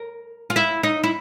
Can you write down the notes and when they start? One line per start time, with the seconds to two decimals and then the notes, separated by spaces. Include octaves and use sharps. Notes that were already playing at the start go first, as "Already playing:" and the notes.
Already playing: A#4
0.50 F4
0.56 E4
0.83 D#4
1.04 E4